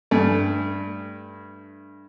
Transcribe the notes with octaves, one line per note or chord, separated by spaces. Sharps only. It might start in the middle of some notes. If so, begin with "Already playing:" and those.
G2 A3